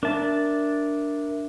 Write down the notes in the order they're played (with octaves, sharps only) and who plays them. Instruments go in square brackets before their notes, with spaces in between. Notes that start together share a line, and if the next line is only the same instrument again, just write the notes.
[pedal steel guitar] D4 A5 [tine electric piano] A#4 E5